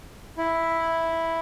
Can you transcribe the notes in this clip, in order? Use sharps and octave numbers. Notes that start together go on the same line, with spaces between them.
E4